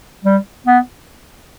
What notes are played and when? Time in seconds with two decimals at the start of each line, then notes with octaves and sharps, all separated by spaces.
0.25 G3
0.66 B3